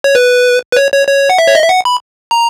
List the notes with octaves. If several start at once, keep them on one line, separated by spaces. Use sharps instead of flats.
C#5
B4
B4
C#5
C#5
C#5
F#5
E5
C#5
D#5
E5
F#5
B5
A#5